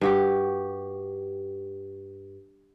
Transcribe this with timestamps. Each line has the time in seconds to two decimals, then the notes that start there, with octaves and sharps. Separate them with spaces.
0.01 G2 F#4 G4